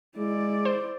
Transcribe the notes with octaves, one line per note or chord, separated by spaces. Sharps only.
G#3 E4 D5
C5